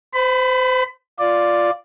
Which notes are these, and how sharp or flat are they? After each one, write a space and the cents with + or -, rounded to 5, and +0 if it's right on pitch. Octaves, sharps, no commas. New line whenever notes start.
C5 -30 B5 +20
F4 +0 D5 +0